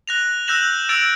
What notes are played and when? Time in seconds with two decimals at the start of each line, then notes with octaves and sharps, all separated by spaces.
0.08 F#6 A#6 F7
0.48 E6 F#6 G6 A#6 E7 F#7
0.89 E6 A6 D7 F7